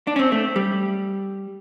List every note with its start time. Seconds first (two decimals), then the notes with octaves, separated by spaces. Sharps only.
0.07 D4
0.16 C#4
0.19 C4
0.32 A3
0.56 G3